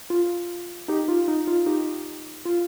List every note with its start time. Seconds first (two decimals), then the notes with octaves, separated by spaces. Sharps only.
0.10 F4
0.88 D#4 G4
1.08 F4
1.28 D#4
1.48 F4
1.66 D#4 G4
2.45 F4